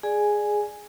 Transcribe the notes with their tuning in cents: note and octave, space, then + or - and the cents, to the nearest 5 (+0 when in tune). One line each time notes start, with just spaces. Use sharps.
G#4 +0 D5 +15 G#5 +0